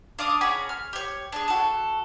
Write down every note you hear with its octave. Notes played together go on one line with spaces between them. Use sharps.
D4 F5 D6 D#6
C#4 F#4 G#4 B5
F6
G4 C#5
D4 G#4
F#4 A4